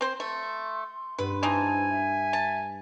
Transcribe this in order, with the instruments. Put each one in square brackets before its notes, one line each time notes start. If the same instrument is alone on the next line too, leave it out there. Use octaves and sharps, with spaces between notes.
[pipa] C4 C5 [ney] C6
[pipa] A3
[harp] G2 [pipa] B4
[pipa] E3 C4 D#4 [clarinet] G#5 [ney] A5
[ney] E5
[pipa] A5